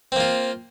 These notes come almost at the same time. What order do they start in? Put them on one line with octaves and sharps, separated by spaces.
C4 A#3 F4